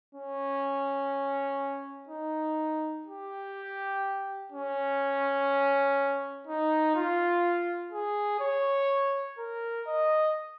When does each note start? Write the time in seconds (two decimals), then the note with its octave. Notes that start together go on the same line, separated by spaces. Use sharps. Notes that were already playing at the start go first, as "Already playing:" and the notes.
0.15 C#4
2.09 D#4
3.07 G4
4.52 C#4
6.47 D#4
6.95 F4
7.92 G#4
8.40 C#5
9.38 A#4
9.87 D#5